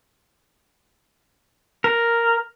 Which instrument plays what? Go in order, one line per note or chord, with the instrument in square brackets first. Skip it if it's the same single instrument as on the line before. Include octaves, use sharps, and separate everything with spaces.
[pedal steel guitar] A#4